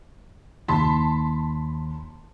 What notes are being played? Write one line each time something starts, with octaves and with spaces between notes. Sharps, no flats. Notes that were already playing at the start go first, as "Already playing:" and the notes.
D#2 A5 B5 C6